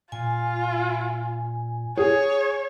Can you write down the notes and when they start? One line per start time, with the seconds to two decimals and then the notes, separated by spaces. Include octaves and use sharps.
0.12 A#2 F4 G#5
1.97 G#4 C#5